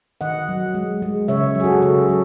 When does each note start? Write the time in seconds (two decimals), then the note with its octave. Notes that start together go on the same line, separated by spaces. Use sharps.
0.21 D#3 D#5 F#5
0.49 F#3
0.74 G#3
1.02 G#3
1.28 C#3 C#5 E5
1.55 F#3 G#4
1.64 F#4 A4
1.82 C#3 A4 C#5
2.09 F#3 A4